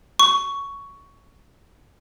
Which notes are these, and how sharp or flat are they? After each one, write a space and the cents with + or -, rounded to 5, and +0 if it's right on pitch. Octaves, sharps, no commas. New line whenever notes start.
C#6 +10